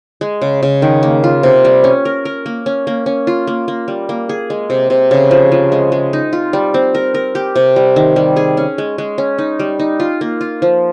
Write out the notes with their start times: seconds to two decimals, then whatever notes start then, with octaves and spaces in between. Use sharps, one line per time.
0.21 G#3
0.42 C#3
0.63 C#3
0.82 D#3
1.03 A#3
1.24 F4
1.43 C3
1.65 G3
1.84 C#4
2.05 A#4
2.25 A#4
2.46 A#3
2.66 C#4
2.87 A#3
3.06 C#4
3.27 F4
3.47 A#3
3.68 A#3
3.88 G3
4.09 A#3
4.29 G#4
4.50 G#3
4.70 C3
4.90 C3
5.11 C#3
5.31 F3
5.52 F3
5.72 G#3
5.92 G#3
6.13 D#4
6.33 F4
6.53 G3
6.74 C4
6.95 A#4
7.14 A#4
7.35 G4
7.56 C3
7.76 G3
7.96 D#3
8.16 G3
8.36 G#4
8.57 C#4
8.78 G#3
8.98 G#3
9.18 C#4
9.38 D#4
9.60 G3
9.79 D#4
10.00 F4
10.21 A#3
10.41 F4
10.62 F3